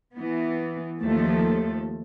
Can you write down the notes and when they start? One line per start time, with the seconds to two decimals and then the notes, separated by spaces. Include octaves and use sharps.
0.15 E3 B3
1.00 D#2 F3 A3 A4